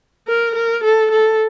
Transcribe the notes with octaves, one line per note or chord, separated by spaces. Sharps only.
A#4
A#4
A4
A4